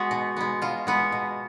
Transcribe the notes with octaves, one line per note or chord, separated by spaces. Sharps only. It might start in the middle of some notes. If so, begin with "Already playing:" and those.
Already playing: G#3 B3 F#4
B2
G#3 B3
B2 F4
G#3 B3
B2